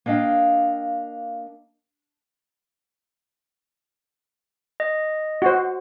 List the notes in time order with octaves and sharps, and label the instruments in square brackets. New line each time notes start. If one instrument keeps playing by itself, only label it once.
[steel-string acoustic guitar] A#3 D4 D#5 F5 G5
[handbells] D#5
[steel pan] F#4 C5